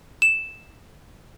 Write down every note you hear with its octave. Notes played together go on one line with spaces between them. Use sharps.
E7